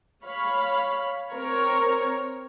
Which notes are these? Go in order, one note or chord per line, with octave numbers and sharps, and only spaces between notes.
C#5 F5 B5
C4 A#4 C#5